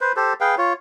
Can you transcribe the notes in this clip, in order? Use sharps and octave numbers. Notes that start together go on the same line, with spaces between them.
B4 C5
G4 A4 C5
G#4 B4 F5 G5
F4 C#5